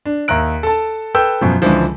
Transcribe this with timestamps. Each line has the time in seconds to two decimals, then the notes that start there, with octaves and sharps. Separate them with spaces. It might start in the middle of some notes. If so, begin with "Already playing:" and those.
0.05 D4
0.28 D#2 E5 A#5 F#6 D7
0.63 A4 A5
1.14 A4 B4 G5 E6 G6
1.41 F#2 B2 F3
1.62 C#2 D3 E3 F3